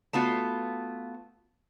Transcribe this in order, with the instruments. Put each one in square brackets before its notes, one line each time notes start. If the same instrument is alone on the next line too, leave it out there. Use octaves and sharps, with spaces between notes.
[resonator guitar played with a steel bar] A3 B3 F4 F#4